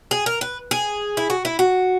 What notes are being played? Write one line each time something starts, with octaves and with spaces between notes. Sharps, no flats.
G#4
A#4
B4
G#4
E4
F#4
E4
F#4